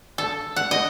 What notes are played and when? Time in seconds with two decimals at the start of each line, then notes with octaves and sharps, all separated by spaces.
0.18 A4
0.56 F#5
0.71 D#5